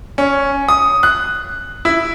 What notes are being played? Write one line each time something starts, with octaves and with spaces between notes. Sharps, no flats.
C#4
D#6
F#6
E4